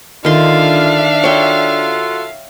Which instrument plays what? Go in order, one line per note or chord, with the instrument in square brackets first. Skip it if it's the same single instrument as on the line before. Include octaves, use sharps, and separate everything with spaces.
[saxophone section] D3 F4 [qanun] D#3 C6 [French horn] D4 [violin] E5 F5
[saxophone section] F4 F#4 A4 [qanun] C#5 G5